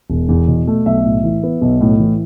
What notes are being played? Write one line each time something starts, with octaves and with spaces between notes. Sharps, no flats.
E1
E2
B2
A3
B1 E5
A2
E3
B3
B1
A2
E3